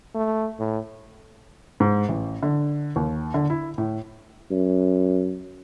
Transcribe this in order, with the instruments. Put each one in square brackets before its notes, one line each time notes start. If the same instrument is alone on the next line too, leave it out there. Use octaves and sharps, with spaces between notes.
[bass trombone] A3
A2
[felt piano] G#2
A1
D3
D#2
D3
E4
A2
[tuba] F#2